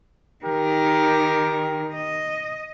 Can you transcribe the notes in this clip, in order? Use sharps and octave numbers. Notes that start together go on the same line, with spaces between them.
D#3 G4 A#4
D#5